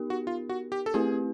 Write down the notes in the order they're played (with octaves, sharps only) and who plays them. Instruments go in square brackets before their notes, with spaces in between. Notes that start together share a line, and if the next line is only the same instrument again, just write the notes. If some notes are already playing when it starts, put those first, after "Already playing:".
Already playing: [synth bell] B3 D#4 G4 A#4
[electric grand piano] F#4
F4
F#4
G4
A4
[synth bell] A3 C4 E4 G4 B4 [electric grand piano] G#4